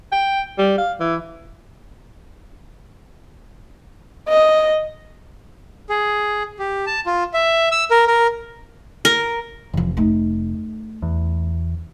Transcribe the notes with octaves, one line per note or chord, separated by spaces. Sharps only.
G5
G3
F5
E3
D#5
G#4
G4
A5
F4
E5
E6
A#4
A#4
A#4
F1 E3 F3
A3 D#4
E2